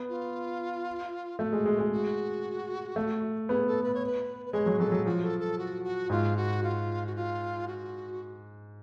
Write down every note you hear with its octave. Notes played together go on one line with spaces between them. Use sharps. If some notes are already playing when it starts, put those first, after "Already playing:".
Already playing: B3
F4
A3 F#4
G#3
G#3
G#3
F#4
A3
B3 G#4
A4
B4
C#5
B4
B4
G#3 C#5
F#3
F#3 A4
F#3
F3 F#4
A4
A4
F#4
F#4
G#2 F4
F#4
F4
F#4
F4
F#4